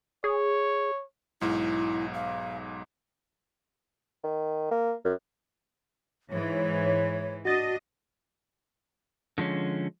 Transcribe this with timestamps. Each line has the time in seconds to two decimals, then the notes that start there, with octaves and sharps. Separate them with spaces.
0.24 G#4 C#5
1.41 B1 G#2 E4
2.14 F5
4.24 D#3
4.71 A#3
5.05 F#2
6.31 G#2 E3 C#5
7.45 D4 F#4 D#5 A6
9.38 D3 F3 G#3 C#4